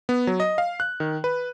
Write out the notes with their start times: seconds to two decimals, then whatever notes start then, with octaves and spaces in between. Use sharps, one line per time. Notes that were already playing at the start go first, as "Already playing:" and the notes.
0.09 B3
0.27 F#3
0.40 D#5
0.58 F5
0.80 F#6
1.00 D#3
1.24 B4